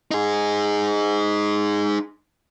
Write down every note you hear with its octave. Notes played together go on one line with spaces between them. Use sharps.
D#4 G#4